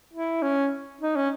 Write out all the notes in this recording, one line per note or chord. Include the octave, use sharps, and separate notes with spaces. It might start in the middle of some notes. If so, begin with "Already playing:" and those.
E4
C#4
D#4
C#4